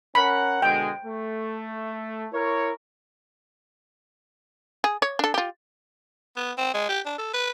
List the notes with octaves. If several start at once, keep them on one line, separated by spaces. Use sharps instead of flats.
C#4 A#4 F#5 B5
B2 D3 G#3 G5
A3
E4 A#4 C#5
G#4
C#5
D4 A4
F4 G4
B3
C4
G#3
G4
D4
A4
B4